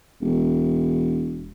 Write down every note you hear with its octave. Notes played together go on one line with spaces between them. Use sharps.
E1